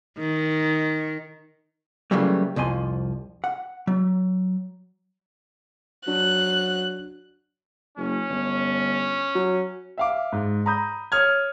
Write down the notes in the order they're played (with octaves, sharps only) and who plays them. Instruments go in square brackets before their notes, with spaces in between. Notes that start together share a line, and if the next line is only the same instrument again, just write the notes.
[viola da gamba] D#3
[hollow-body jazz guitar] C#3 E3 F#3 G3 A3 A#3
C2 F2 F3 G#5 C6
F#5
F#3
[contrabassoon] F#3 [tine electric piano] D4 [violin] F#6
[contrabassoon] F#1 [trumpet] C#4
[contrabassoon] G1
F#3
[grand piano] E5 F5 D6
G#2
A#5 B5 D#6 G6
C#5 D#6 F6 G#6